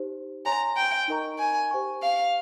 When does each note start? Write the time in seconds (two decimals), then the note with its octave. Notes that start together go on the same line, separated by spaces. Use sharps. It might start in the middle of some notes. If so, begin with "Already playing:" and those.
Already playing: D#4 G4 C5
0.45 C#5 G#5 A#5 C6
0.77 G5
1.08 D#4 A#4 D#5 A#5 C#6
1.39 G#5
1.71 G4 C5 G5 C#6
2.03 F5